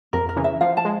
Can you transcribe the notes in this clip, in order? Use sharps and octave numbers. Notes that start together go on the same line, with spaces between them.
F2 A#4
A#4
C#3 E3
E5
F3 F5
A5
G#3